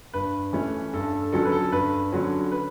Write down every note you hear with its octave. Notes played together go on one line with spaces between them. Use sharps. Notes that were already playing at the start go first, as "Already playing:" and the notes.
G2 B4
E3 A3 C#4
G2 A4
A4
D3 F#3 C#4 A4
B4
A4
G2 B4
D3 F#3 C#4
B4